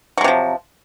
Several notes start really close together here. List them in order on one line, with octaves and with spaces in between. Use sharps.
F#3 G#3 C3 F3